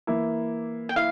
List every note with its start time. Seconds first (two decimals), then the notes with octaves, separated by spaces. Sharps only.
0.07 E3 A#3 E4
0.89 G5
0.96 E4 F5